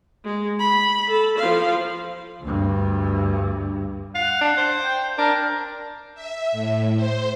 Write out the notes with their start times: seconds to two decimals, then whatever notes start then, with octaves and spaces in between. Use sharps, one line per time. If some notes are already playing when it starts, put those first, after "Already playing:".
0.25 G#3
0.59 B5
1.10 A4
1.38 F3 F5
2.41 D2 G2
4.15 F5 F#5
4.41 D4
4.57 C5
4.84 G5
5.18 D4 A#4
6.15 E5
6.52 A2
6.96 C5